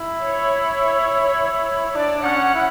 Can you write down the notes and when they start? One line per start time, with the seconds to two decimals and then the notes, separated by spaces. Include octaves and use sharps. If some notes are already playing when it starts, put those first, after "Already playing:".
Already playing: E4
0.20 C#5
1.95 D4 D5
2.24 C#4 F#5
2.55 E4